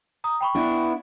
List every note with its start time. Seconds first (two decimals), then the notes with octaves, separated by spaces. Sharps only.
0.24 A#5 D#6
0.41 G5 B5 C#6
0.55 B3 D4 E4